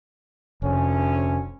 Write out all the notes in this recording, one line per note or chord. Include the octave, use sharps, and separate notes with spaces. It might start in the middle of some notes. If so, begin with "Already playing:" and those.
F1 D2 C#4